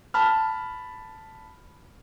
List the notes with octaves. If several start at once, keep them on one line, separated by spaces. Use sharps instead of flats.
A5 B5 F6